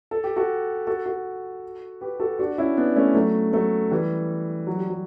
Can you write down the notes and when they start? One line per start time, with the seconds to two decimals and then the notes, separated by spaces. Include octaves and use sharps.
0.11 A4
0.24 G4
0.36 F#4 A4
0.87 F#4 A4
1.06 F#4 A4
2.01 G4 B4
2.20 F#4 A4
2.39 D4 F#4
2.58 C#4 E4
2.77 B3 D4
2.96 A3 C#4
3.15 F#3 A3
3.53 F#3 A3
3.91 E3 G3
4.67 F#3
4.78 G3
4.90 F#3